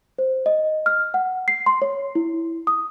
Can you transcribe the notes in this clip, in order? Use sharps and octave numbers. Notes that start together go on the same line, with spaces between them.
C5
D#5
F6
F#5
C7
C6
C#5
E4
D#6